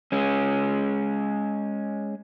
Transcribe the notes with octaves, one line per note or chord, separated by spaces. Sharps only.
G#3 C#4